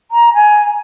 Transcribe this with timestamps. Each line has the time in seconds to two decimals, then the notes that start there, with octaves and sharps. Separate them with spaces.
0.11 A#5
0.34 G#5